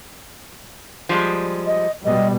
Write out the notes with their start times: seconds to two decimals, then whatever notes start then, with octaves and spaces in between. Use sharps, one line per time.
1.09 F3 G3 G#3
1.67 D#5
2.05 B2 G3 D#5